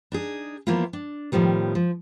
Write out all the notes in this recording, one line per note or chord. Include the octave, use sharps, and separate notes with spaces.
D4 D#4 G#4
E3 F3 A#3 B3 E4 F4
D4
A2 D#3 F3 G3 B3
F3